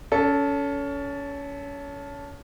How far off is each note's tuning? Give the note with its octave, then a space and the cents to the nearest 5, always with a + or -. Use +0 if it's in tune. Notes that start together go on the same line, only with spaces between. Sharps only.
C#4 +25 A4 -5